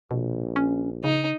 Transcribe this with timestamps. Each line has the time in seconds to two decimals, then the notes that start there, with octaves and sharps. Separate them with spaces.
0.11 A#1 B2
0.56 C#4
1.04 C#3 D#4